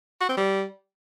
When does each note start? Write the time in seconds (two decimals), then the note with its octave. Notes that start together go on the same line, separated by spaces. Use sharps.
0.21 F#4
0.29 C4
0.37 G3